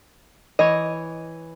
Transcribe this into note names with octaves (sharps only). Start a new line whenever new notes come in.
E3 C#5 D#5